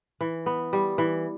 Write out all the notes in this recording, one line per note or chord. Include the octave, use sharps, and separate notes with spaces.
E3
B3
G3
E3